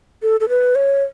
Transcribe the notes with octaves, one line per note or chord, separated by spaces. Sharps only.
A4
A4
B4
C#5